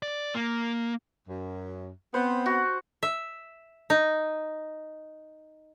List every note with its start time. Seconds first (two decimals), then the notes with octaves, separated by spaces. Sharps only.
0.03 D5
0.35 A#3
1.27 F#2
2.14 B3 C4 C5
2.46 F#4
3.03 E5
3.90 D#4